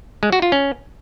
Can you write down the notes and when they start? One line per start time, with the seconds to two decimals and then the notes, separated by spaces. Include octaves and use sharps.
0.23 G#3
0.32 F#4
0.42 F4
0.52 C#4